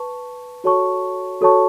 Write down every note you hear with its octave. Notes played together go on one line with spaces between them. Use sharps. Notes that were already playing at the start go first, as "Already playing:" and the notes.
Already playing: B4 A5 C#6
F#4 A4 C#5 A5 C#6
F#4 A4 C#5 A5 C#6